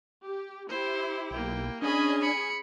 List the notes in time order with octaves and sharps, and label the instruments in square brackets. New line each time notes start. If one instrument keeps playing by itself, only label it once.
[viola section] G4
[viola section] E4 G4 [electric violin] C5
[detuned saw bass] B1 [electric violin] A#3 G5
[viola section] C#4 G#4 G#5 [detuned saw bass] D4 [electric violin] D#5 B5
[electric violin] B5 C#7